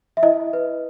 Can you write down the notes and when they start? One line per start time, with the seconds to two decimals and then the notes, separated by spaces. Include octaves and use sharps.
0.17 E5
0.23 E4 D#5
0.53 B4